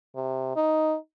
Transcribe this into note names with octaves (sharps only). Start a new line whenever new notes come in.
C3
D#4